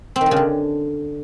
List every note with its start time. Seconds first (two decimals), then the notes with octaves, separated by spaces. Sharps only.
0.16 C4
0.21 D#3
0.26 G3
0.31 C#3
0.36 D3